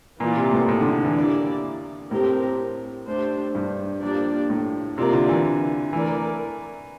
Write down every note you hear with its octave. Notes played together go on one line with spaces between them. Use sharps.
A#2 E3 A#3 F4 A#4 D5
C3
A2
A2
D3
D3
E3
A#3 E4 G4 D5
A2 C4 G4 A#4
A3 D4 G4 C5
G2
F3 A#3 D4 G4 D5
A2
C3 A#3 F4 A#4 D5
D3
E3
E3 A3 E4 A#4 D5